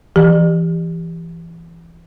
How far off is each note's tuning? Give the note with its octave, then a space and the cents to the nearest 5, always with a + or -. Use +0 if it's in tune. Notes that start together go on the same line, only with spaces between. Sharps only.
E3 +25 G4 +10 D5 +40